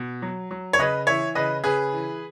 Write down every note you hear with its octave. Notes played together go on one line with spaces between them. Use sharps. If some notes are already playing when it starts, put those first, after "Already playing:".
Already playing: B2
F#3
F#3
C#5
C#3 B4 D#5
E3 C#5 E5
C#3 B4 D#5
C#3 G#4 B4
E3